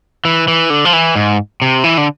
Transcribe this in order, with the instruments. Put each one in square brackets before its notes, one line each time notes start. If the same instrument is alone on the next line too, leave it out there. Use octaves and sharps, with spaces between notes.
[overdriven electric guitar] E3
E3
D3
F3
E3
G#2
C3
E3
D3